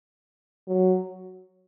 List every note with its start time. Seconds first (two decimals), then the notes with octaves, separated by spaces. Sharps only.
0.68 F#3